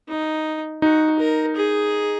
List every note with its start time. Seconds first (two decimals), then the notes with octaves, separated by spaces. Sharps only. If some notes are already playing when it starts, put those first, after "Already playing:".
0.08 D#4
0.82 D#4 F#4
1.19 A#4
1.56 G#4